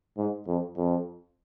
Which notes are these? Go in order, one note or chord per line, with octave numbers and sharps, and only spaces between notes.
G#2
F2
F2